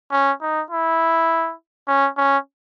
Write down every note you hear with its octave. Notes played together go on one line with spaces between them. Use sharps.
C#4
D#4
E4
C#4
C#4